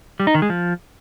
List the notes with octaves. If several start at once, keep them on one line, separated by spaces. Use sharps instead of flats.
G3
D#4
D#3
G#3
F3